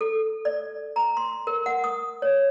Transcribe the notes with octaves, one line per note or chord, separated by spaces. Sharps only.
A4
D5
A#5
C6
A#4
F#5
D#6
C#5